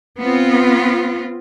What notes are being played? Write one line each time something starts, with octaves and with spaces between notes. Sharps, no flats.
B3 C4 F4